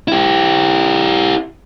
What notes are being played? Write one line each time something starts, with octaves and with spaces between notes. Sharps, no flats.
E4 G4